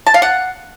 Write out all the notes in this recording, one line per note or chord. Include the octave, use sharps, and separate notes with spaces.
A5
F5
F#5